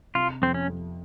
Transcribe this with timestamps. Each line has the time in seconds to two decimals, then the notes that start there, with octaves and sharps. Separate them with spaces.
0.15 C3 F4
0.41 F2 C4
0.54 C#4
0.68 F2